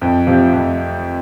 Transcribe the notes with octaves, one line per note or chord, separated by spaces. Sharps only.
F2
C3 F3
F2